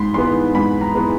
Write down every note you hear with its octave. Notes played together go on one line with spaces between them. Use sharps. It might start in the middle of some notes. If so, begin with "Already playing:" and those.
Already playing: G#2 B5 C6
E3 G#3 B3 C6
G#2 B5
A#5
E3 G#3 B3